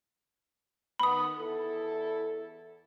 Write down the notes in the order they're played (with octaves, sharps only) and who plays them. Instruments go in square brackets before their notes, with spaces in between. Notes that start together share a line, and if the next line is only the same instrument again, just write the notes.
[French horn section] D#3 B3 [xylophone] B5 D#6
[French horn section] E2 E4 A4